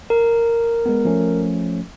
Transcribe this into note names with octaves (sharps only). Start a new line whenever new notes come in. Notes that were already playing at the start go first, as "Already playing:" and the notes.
A#4
G#3 B3
F3 A3 C#4